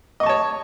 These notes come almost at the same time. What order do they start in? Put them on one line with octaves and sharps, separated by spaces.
D#5 C#6 A5 C#5